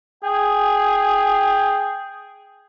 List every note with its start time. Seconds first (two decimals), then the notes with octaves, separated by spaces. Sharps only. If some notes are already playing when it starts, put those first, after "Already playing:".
0.23 G#4 G5